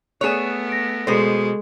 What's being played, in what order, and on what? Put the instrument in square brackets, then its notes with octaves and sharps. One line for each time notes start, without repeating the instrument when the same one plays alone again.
[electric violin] A3 B3 [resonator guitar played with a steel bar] G#4 C#5 [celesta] F#6 E7
[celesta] A#6 D7
[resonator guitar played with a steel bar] B2 C5 [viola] G#3 [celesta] A4